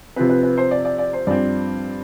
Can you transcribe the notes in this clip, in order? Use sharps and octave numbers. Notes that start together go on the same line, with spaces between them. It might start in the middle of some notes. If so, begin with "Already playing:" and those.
C3 F3 C4 B4
B4
B4
C5
D5
D5
D5
C5
G2 F3 C4 D5